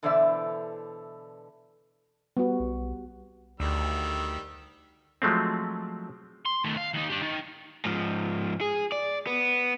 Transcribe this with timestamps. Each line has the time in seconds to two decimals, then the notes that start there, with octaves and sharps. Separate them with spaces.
0.03 B2 D3 E3 C5 D5 E5
2.37 G3 B3 F#4
2.60 B1
3.60 D2 D#3 G3 E6
5.22 F3 F#3 G#3 A3 C4
6.46 C6
6.64 D#3 A3
6.77 F5
6.93 D#2 D#4
7.10 D4 G4
7.21 D#3
7.85 G#2 F3
8.61 G#4
8.92 D5
9.27 B3